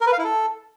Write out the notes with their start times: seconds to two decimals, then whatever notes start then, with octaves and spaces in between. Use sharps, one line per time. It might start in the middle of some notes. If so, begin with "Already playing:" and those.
0.01 A#4
0.07 B4
0.13 F5
0.18 E4
0.24 A4